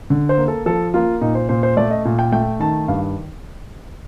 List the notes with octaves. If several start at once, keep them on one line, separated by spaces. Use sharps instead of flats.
D3
C5
A#3
A4
F3 A4
A#3 F4
A#2 D#4
C5
A#2 C5
C5
A3 D5
D#5
A#2
G5
A3 G5
D#3 A5
G2 F5